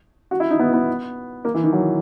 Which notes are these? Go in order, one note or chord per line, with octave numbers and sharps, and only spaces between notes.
F#4
E4
D#4
B3
B3
A#3
E3
D#3
F#3